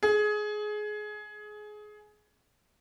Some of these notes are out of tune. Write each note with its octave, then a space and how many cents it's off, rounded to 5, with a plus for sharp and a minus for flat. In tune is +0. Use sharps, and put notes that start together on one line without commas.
G#4 +20